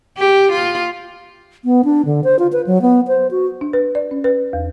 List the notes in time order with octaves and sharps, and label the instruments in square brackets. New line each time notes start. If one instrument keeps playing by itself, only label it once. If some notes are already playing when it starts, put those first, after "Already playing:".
[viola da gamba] G4
F4
[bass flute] B3
D4
D3
C5
F4
B4
F#3
B3
C5
F#4
[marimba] D4
B4
D5
C#4
B4
E2